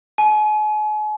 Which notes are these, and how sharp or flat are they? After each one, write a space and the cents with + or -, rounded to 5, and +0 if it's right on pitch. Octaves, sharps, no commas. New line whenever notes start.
G#5 +40